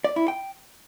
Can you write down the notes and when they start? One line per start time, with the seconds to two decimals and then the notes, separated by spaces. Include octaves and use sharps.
0.04 D5
0.16 E4
0.28 G5